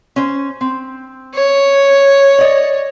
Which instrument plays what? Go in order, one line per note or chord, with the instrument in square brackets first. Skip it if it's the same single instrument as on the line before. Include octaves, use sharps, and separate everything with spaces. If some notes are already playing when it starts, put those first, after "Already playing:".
[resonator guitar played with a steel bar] C#4 C5
C4
[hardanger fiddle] C#5
[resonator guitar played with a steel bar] D5 D#5